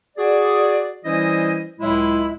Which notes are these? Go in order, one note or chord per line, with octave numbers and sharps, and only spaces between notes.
F#4 G#4 D5
E3 G3 C#4 E4 C5 D#5
C#2 A2 F#3 G#3 E4